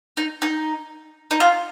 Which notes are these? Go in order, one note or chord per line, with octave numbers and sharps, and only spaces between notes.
D#4
D#4
D#4
F4